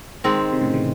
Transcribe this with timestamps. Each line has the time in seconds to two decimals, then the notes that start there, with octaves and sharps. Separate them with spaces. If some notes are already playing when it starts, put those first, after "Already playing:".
0.24 D#3 G#3 C4
0.53 C3
0.61 A2 C#3
0.73 C#3 E3